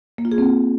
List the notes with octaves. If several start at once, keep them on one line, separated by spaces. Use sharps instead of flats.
A#3
F4
G#4
C4